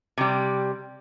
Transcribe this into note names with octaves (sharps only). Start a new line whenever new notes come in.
C3 G3